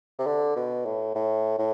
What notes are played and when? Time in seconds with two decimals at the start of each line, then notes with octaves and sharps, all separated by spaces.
0.19 C3
0.27 D3
0.56 B2
0.85 A2
1.15 A2
1.58 A2